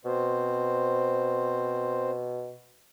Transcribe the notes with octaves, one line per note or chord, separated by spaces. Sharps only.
B2 C4 C5